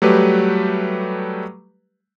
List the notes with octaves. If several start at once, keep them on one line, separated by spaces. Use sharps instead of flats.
F#3 G3 A3 G4 B4